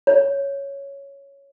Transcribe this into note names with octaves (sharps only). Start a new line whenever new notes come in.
C#5